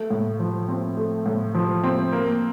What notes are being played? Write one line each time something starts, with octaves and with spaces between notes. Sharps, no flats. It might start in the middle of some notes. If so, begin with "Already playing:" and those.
Already playing: A3
A2
F3
C4
A3
A2
F3
C4
A#3